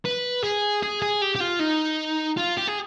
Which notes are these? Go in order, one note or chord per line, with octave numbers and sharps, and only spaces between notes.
B4
G#4
G#4
G#4
G4
G4
F4
D#4
F4
G4
G#4